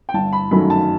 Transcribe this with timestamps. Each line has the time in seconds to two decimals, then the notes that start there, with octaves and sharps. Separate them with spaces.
0.09 G5
0.14 G1 A5
0.33 B5
0.51 F#2 D#3 F#3 A3 B5
0.70 A5